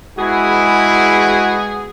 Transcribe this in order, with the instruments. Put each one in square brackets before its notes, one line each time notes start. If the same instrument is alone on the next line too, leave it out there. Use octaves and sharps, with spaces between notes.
[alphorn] G#3 [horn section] B3 G#4 [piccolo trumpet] E4 [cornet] F#4